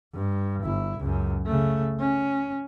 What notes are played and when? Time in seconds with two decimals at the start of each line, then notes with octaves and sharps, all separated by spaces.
0.14 G2
0.63 G1 E4
1.00 C#2 F#2
1.46 C#3 A3
1.99 C#4